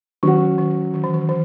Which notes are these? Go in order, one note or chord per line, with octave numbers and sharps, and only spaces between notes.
D#3 F#3 C#4 F#4
D#3
D#3
E3
D#3
E3